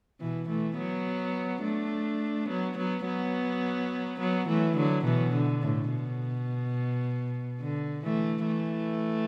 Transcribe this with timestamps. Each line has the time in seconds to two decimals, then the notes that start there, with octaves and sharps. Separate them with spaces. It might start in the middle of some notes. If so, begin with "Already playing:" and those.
0.20 B2 E3
0.49 E3 A3
0.77 F#3 B3
1.63 A3 D4
2.48 F#3 B3
2.77 F#3 B3
3.05 F#3 B3
4.19 F#3 B3
4.48 E3 A3
4.76 D3 F#3
5.04 B2 E3
5.33 D3
5.62 A2
5.90 B2
7.61 D3
8.04 E3 A3
8.46 E3 A3